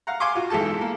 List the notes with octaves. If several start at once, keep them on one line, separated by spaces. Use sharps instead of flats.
F5 F#5 A#5
F5 G#5 C6 D6
F4 F#4
B1 E3 G#3 A4 A5
A#3